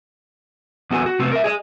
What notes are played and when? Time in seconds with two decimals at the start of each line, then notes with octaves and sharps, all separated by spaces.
0.90 E2 B3 F#4 A4 G#5
1.06 F#4
1.19 C3 A3 B3 C4
1.31 A#4 E5
1.44 G#4 D5 D#5